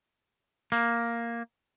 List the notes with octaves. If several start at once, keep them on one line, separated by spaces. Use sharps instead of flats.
A#3